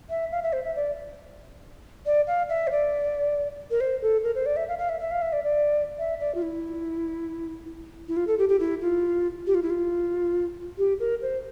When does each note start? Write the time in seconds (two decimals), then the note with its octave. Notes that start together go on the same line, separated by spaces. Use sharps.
0.10 E5
0.32 F5
0.43 E5
0.53 C5
0.64 E5
0.76 D5
2.06 D5
2.27 F5
2.49 E5
2.67 C5
2.71 D5
3.71 A#4
3.81 C5
4.02 A4
4.24 A#4
4.35 C5
4.46 D5
4.57 E5
4.68 F5
4.78 F5
4.89 E5
5.00 E5
5.11 F5
5.22 E5
5.33 D5
5.44 D5
5.99 E5
6.20 D5
6.35 F4
6.42 E4
8.08 E4
8.17 F4
8.27 A4
8.38 G4
8.49 G4
8.60 E4
8.81 F4
9.47 G4
9.55 F4
9.62 E4
9.70 F4
10.78 G4
11.00 A#4
11.22 C5